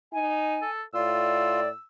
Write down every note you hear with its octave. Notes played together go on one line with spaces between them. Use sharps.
D#4 G#5
A4
A2 F4 D5 E6